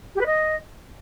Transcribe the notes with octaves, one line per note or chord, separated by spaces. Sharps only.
G4
B4
D#5